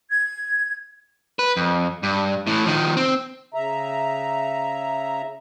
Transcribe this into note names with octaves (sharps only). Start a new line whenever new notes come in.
G#6
B4
F2
G2
A2 E3
D#3 F3
C4
C#3 E5 A#5